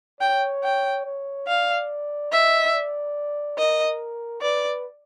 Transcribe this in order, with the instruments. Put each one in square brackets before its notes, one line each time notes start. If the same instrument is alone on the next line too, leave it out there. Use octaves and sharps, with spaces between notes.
[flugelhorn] C#5 [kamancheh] G5
[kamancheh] G5
[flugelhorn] C#5
[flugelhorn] D5 [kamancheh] F5
[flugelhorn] D#5 [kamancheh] E5
[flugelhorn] D5
[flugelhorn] A#4 [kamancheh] D#5
[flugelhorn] B4 [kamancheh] D5